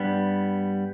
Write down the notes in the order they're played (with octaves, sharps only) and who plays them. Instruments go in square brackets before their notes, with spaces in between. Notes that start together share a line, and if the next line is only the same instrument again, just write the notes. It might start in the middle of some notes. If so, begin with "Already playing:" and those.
Already playing: [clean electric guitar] G2 G3 B3